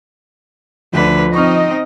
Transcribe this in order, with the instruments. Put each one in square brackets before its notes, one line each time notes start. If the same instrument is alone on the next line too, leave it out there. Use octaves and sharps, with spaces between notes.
[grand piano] D2 D4 [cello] D3 B4 [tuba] F3
[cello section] C4 D#5 [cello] D#4 [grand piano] C#6 F6